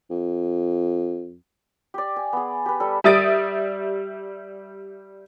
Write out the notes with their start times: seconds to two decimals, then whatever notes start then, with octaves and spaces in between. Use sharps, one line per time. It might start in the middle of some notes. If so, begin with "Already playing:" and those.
0.10 F2
1.94 G4 D5
2.16 G#5
2.33 B3 G#4
2.66 G4 B4
2.80 G3 A4
3.04 G3 E5 D#6 A6 D7